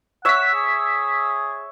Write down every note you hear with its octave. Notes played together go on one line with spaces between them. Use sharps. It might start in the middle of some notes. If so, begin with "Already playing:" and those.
C#5 E5 F#5 E6 B6
G#4